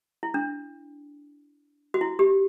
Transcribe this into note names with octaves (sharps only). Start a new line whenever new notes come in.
E4
D4
F#4
E4
G4